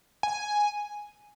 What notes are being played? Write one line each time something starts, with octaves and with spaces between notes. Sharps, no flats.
G#5